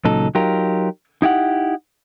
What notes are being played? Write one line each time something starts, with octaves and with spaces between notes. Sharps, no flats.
C#2 A#2 C#3 F#3 D#4 A4
F#3 D#4 F4 G4 A#4
D#4 E4 G4 F#5